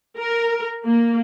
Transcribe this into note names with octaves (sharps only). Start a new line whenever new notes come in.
A#4
A#3